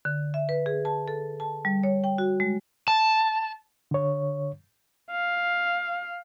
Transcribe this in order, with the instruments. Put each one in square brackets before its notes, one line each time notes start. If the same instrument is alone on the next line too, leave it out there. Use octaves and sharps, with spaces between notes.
[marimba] D3
E5
B4
G#4
A5
A4
A5
G3
C#5
G5
F#4
G#3
[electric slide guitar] A5
[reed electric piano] D3 C#5
[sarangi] F5